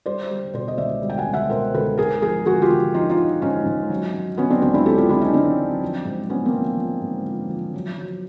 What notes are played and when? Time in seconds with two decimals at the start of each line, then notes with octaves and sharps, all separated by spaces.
0.06 G3 C5 D5
0.31 G3
0.54 B2 C5 D5
0.68 D#5
0.78 C#2 D5 E5
1.02 G3
1.10 G5
1.18 F#5 G#5
1.26 C#2
1.34 E5 F#5
1.50 B2 A#4 C5
1.74 C#2 A4 B4
1.98 G#2 G#4 A#4
2.22 F3 G#4 A#4
2.46 F3 F#4 G#4
2.62 F4 G4
2.70 F3
2.94 F3 D#4 F4
3.09 D#4 F4
3.18 F3
3.42 G#2 C#4 D#4
3.66 G#2
3.90 F#3
4.14 F#3
4.38 F#3 B3 C#4
4.50 C4 D4
4.62 C#2 C4 D4
4.74 D4 E4
4.85 C#2 G4 A4
4.98 F4 G4
5.09 C#2 D4 E4
5.22 C#4 D#4
5.33 C#2 C4 D4
5.58 F#3
5.82 F3
6.05 G#2
6.30 F3 B3 C#4
6.45 A#3 C4
6.54 F3
6.78 F3
7.01 G#2
7.26 F3
7.49 F3
7.74 F#3
7.98 F#3